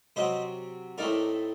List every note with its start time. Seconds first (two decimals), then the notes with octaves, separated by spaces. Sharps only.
0.16 C3 F#3 C4 C5 D#5
0.98 A2 A3 C4 D#4 A#4 D5